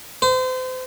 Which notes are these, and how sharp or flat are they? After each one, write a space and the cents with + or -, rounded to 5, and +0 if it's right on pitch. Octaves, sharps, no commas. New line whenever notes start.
C5 -35